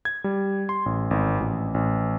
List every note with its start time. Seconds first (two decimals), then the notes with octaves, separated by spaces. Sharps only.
0.05 G#6
0.24 G3
0.69 C6
0.86 A1
1.11 G#1
1.40 A1
1.74 A1